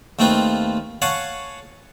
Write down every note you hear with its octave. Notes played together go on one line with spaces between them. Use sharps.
D#2 A3 C4 F4 B4
C#5 F5 F#5 G#5 A5 C#6